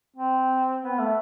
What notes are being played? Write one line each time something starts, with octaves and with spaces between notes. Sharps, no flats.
C4
B3
A3